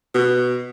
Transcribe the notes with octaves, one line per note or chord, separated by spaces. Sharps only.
B2